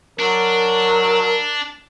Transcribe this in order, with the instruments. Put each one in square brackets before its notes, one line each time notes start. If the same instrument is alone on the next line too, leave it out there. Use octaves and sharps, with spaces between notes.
[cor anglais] F#3 [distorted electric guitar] D4 [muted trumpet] A#4